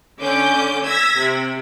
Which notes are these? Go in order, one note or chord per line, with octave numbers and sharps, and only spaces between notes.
D3 C#4 D6 G6
E6 G#6 A#6 B6
C3